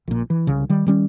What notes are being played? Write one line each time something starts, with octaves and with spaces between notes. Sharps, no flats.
A#1 A#2
E3
C2 C#3
D#3 G3
D#3 G3 C#4